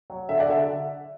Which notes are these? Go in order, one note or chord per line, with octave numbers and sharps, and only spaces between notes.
F#3
D3 E5
D5 F#5
D3 E5